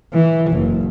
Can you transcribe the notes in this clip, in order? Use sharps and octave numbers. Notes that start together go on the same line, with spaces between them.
E3
F#1